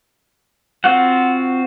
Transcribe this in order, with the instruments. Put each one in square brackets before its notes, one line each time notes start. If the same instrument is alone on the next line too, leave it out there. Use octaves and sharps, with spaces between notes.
[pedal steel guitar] C4 F4 F#4 F#5